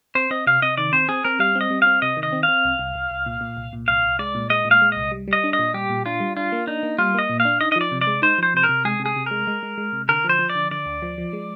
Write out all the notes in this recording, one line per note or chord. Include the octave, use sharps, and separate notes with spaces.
C4 C5
C4 D#5
C3 F5
C3 D#5
D#3 D5
C4 C5
C4 G#4
C4 A#4
G3 F5
C4
D#5
G3
C4 F5
C3 D#5
D#3
D#5
C4
F5
C4
C2
C2
C2
C2
A#2
A#2
C2
A#2
C2 F5
C2
G#3 D5
A#2
G#3 D#5
A#2
F5
G#3
C2 D#5
G3
G3
D#5
D4
D#5
A#2
G3 G4
A#2
D4 F4
G3
D4 F4
A#3
D4 D#4
A#3
G3 F4
A#3 D#5
A#2
F5
D4
D#4 D#5
D#5
F3 D5
C3
D5
G#3
D#4 C5
F3 C5
C3 C5
A#4
C3
G#3 G#4
C3
G#4
C3
G#3 A#4
G#3
G#3
G#3
C3
D3 A#4
F3
C5
F3
D5
D3
D3 D5
D2
F3
F3
G#3